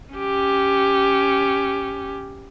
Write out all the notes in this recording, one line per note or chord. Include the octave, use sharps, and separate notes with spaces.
C#4 G4